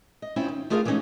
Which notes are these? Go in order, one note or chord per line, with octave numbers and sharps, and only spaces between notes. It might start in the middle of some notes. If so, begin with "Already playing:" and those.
D#5
C4 C#4 E4 F4 C5
D#3
A3 F4 G#4 A#4 D#5 F5
E3 G#3 A3 C#4 D#4 G#4